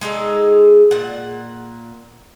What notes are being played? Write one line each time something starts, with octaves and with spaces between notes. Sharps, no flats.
G#3 D#4 G#4 A4
A#2 F#5